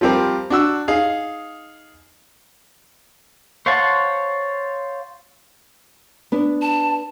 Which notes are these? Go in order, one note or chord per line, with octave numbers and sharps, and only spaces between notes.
F3 G3 C4 G4 A#4
D4 F#4 E6
D#4 G#4 F5
C5 C#5 F5 F#5 A5
B3 D4
A5